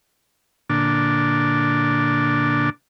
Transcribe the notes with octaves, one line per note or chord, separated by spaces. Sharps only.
A#2 D3 D4